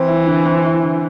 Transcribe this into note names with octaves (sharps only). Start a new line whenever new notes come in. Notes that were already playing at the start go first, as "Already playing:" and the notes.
Already playing: E3 C4
E4
D3
C4
E4
D3